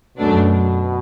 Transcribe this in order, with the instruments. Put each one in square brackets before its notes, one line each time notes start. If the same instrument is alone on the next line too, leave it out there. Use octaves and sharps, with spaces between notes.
[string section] F#2 F#3 A3 D4 [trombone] B2